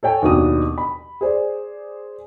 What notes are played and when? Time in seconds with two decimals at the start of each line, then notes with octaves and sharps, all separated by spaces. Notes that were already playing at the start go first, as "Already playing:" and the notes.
0.03 A4 C#5 G5 G#5
0.22 D#2 B2 B3 D4 D#6
0.78 B5
1.21 G#4 C5 D5